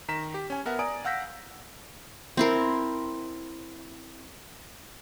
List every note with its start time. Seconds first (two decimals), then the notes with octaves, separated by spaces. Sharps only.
0.08 D#3 A#5 B6 E7
0.34 G4
0.50 C#4 G#5
0.66 B3 A#4 E5 F#5
0.79 D5 G#5 A#5 D#6 D7
1.05 F5 F#5 E6 G6 A#6 B6
2.37 C4 E4 A#4